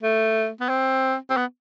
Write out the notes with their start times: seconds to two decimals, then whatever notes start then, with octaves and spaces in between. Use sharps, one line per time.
0.03 A3
0.60 B3
0.69 C4
1.30 C4
1.37 B3